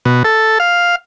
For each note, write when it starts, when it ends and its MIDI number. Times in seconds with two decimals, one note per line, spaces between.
0.05 0.23 47
0.25 0.58 69
0.60 0.96 77